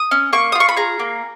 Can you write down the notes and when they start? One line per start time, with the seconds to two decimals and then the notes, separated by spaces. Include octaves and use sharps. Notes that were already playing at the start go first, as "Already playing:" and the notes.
Already playing: D#6
0.11 C#4
0.33 A#3 C#6
0.52 D#6
0.55 F4
0.60 C#6
0.69 B5
0.77 G#4 A#5
0.99 A#3